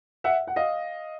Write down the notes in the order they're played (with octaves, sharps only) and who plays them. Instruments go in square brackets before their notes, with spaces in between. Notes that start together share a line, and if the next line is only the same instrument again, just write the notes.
[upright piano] E5 F#5
F#5
D#5 F5